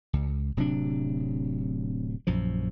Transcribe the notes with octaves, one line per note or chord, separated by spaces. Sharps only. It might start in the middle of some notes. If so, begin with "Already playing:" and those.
C#2
D1 C3 F#3 D4
A#1 F#2 F3